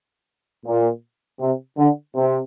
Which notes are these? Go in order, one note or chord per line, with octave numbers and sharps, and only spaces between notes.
A#2
C3
D3
C3